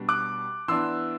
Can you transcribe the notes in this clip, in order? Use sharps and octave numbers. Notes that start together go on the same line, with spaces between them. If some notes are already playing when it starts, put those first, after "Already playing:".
Already playing: B2 G3 D4
D6 F#6
E3 B3 D4 C6 E6